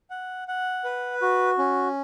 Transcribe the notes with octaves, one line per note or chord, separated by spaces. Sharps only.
F#5
F#5
B4
F#4
C#4